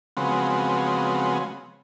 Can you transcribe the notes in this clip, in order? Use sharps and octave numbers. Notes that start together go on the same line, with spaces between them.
C#3 F3 F#3 G#3 B3 C4